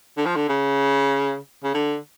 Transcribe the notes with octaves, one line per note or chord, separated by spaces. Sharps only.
D3
F3
D3
C#3
C#3
D3